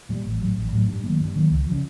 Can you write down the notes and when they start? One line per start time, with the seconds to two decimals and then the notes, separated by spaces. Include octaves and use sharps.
0.09 A#2 G3
0.25 A1
0.41 A2 F#3
0.56 A1
0.72 A2 F#3
0.88 G2
1.04 D#3 F#3 A#3
1.20 G2
1.36 D#3 F#3 A#3
1.51 C#2
1.67 C#3 F3